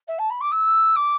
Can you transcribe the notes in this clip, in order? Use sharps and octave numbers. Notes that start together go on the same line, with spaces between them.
E5
A5
B5
D6
E6
D6